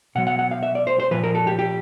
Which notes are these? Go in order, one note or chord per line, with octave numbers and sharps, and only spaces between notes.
B2 F#3 F#5
F#5
F#5
F5
E5
D5
C5
C5
A#2 F3 B4
A#4
A4
G4
G4